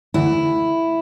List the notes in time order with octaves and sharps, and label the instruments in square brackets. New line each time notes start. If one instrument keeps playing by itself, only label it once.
[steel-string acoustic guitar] D2 E4